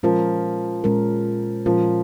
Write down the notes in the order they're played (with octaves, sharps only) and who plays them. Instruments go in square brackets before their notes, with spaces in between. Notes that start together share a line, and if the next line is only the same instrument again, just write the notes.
[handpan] A#2 G#3 C#4 F4 A#4 [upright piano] F3
[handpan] A#2 G#3 C#4 F4 A#4
[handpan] A#2 G#3 C#4 F4 A#4 [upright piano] F3